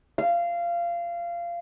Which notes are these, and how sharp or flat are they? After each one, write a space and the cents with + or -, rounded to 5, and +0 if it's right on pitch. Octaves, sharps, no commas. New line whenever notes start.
F5 -20